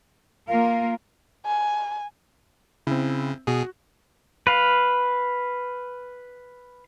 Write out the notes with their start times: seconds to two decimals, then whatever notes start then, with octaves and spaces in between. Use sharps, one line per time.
0.48 A#3 F4 A#4 F5
1.45 G#5
2.87 C#3 C4 E4
3.47 B2 F#4 G#4
4.47 B4 F5